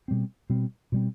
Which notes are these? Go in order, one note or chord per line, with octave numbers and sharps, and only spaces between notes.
B2 G3 C4
B2 G3 C4
B2 G3 C4